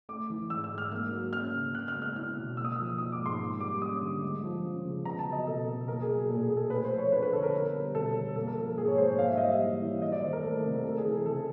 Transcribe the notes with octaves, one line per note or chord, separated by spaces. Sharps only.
A3 D6
E3
G#2 E6
E6
G#2
F6
A#3 F6
F#3
C#4 F6
C#3
B3 F#6
F6
G#3
F6
E4 F6
B2
A#3 E6
D#6
E6
F3
D#4 D#6
D6
G#2
C6
A#3
G3 D6
C#4 D#6
D3
G#3
F3
C#4
C#3
B3 A#5
A5
F#3
D#5
B2 A4
B2
A#3 A#4
G#4
F#3
A#2 A4
G#4
A#2
A4
A3 B4
C5
F3
C#5
D4 B4
B4
D3 A4
A#4
B3
G3
B2 A4
B2
A#3 A4
A#4
F3 A4
G#2 G#4
C#5
G#2 C5
C#5
A#3 F5
E5
G3 D#5
E5
E3
E3
F#3 D#5
D5
D#3 C5
A#4
A3 A4
C3
A#4
A3 A4
G#4
E3
A4
C#3 A4